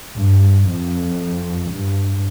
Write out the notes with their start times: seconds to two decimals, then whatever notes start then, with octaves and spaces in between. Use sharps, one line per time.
0.18 G2
0.70 F2
1.72 G2